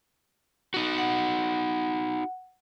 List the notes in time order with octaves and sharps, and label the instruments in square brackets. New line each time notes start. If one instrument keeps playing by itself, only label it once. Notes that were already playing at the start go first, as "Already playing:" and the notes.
[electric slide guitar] D#4 F#4
[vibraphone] F#5